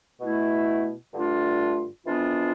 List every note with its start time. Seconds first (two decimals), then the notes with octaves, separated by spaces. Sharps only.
0.20 B2 A3 E4
1.13 G2 D3 A3 D4 F4
2.05 F2 E3 B3 D4 F4